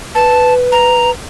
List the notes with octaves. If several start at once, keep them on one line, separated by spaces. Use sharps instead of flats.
B4 A5
A#5